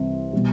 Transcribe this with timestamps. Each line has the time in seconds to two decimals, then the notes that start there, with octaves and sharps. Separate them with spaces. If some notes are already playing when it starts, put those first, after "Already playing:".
Already playing: C2 C3 E3
0.33 B2 G3